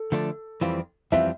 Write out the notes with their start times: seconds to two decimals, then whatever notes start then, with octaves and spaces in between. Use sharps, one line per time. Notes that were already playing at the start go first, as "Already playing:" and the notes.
Already playing: A4
0.12 D3 F3 A3 D4
0.61 F2 E3 G3 C4 F4
1.12 F2 E3 G3 C4 F4 E5